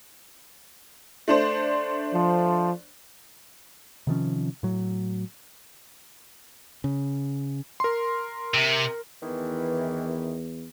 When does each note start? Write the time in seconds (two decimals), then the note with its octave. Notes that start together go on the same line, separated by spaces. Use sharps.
1.28 A3 D4 C5
2.14 F3
4.07 C3 D#3 F3 C#4
4.63 A2 F#3
6.84 C#3
7.80 A#4 C6
8.54 C3
9.22 E2 D#3 E3